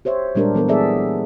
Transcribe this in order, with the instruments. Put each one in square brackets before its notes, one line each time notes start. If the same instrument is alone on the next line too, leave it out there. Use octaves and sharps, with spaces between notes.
[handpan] G4 C5 C#5 E5
A#2 G3 G#3 D4 G4 A#4
E3 B3 A4 A#4
F#3 B3 G#4 A4 D5 E5